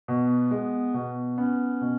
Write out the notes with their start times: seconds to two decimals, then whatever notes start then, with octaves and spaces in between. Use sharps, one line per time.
0.08 B2
0.23 B3
0.51 G#3
0.94 B2
1.37 B3 C#4
1.81 B2